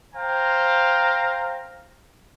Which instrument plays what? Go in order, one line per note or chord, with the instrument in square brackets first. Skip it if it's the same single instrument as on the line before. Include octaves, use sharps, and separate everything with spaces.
[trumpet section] C5 F5 G5 A#5